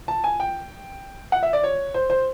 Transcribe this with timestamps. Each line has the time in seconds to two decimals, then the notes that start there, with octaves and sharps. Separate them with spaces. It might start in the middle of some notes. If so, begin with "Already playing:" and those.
0.08 A5
0.24 G#5
0.40 G5
1.32 F#5
1.43 E5
1.53 D5
1.63 C#5
1.94 C5
2.10 C5